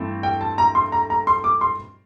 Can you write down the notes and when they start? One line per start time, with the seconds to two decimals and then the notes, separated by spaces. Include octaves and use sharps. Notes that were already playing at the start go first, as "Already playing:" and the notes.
Already playing: G2 E3 A3 C4
0.23 G5
0.41 A5
0.58 A#5
0.75 C6
0.92 A#5
1.10 A#5
1.27 C6
1.44 D6
1.61 C6